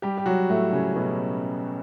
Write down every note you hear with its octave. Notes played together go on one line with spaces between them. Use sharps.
G3 G4
G4
F#3 F#4
A2 A3
C#3 C#4
A3
B2 B3